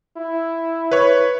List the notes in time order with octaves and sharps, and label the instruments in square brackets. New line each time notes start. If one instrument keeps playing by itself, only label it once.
[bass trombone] E4
[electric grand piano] B4 C#5